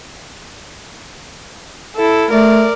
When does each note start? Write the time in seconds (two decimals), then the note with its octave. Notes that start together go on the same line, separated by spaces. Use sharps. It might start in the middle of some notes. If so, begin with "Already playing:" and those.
1.96 E4 A4
2.31 A3 A#4 D5